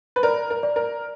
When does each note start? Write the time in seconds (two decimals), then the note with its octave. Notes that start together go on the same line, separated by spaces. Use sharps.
0.16 B4
0.23 A#4 D5
0.50 A#4
0.63 D5
0.76 A#4